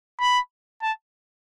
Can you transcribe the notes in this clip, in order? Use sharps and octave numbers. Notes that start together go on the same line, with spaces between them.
B5
A5